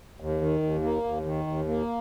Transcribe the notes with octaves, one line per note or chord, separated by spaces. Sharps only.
D#2
D#3
D#2
A#3
D#2
D#3
D#2
A#3